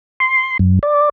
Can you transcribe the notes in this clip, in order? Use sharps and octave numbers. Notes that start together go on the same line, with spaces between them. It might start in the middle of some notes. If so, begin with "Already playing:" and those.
C6
F#2
D5